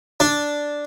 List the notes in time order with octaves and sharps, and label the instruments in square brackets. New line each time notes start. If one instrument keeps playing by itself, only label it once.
[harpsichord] D4